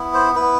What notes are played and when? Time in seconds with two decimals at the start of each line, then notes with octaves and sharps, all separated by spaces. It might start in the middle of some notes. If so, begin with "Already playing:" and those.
Already playing: B3 E4
0.14 C5
0.35 B3 E4 B4